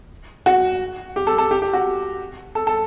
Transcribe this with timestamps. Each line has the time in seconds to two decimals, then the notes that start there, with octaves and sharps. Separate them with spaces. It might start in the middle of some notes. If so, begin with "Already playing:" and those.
0.46 F#4
1.16 G4
1.27 A4
1.38 A4
1.51 G4
1.62 G4
1.73 F#4
2.55 A4
2.67 A4